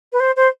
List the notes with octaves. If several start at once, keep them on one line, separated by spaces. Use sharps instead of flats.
B4
C5
C5